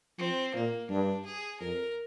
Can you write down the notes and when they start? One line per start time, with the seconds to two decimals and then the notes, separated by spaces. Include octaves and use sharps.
0.18 F3 C4
0.54 A#2 A#3
0.90 G2 D4
1.25 G#4
1.61 F2 A#4